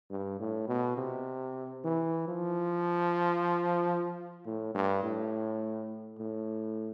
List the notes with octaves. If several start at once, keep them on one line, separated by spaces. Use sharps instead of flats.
G2
A2
B2
C3
E3
F3
A2
G2
A2
A2